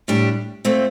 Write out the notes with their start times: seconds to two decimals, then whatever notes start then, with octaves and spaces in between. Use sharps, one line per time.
0.08 A2 G3 D4 G4
0.65 A#2 A3 C4